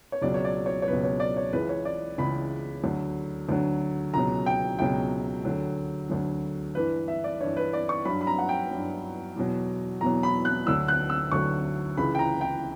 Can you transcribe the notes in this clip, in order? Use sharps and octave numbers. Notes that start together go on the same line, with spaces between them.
C#5
C#2 B2 F#3 D5
C#5
D5
C#5
C#5
C#2 B2 F#3 B4
C#5
D5
C#5
C#2 C#3 E3 B4
C#5
D5
C#2 C#3 E3 B5
D2 D3 F#3
D2 D3 F#3
C#2 B2 F#3 A#5
G5
C#2 B2 F#3 G5
D2 D3 F#3
D2 D3 F#3
G2 E3 B4
E5
D5
G2 E3 C#5
B4
D5
C#6
G2 F#3 B5
B5
A#5
F#5
G5
G2 F#3
E2 B2 F#3
E2 B2 F#3 A#5
B5
F#6
D2 D3 F#3 E6
F#6
E6
D2 D3 F#3 C#6
C#2 C#3 E3 B5
G5
A#5
G5